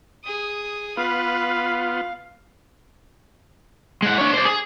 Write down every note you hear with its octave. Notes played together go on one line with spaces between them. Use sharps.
G#4 D#6
B3 F4 B4 F5
G#3 F#5
D4 C#5
C5 D5
G#4